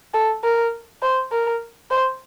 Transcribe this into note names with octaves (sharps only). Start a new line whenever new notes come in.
A4
A#4
C5
A#4
C5